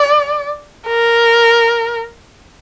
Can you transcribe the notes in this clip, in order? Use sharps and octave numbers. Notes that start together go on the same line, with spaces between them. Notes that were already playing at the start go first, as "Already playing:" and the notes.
Already playing: D5
A#4